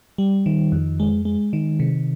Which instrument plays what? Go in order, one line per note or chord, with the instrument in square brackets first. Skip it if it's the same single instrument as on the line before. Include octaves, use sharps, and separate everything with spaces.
[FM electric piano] G3
D#3
F2
G#3
G#3
D#3
C3